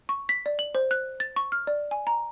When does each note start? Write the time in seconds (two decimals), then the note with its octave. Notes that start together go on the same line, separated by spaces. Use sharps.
0.09 C#6
0.29 B6
0.46 D5
0.59 F#7
0.75 C5
0.91 F#6
1.20 A6
1.36 C#6
1.52 F6
1.67 D5
1.91 G#5
2.07 A#5